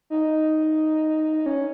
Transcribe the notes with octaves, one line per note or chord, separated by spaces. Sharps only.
D#4
C#4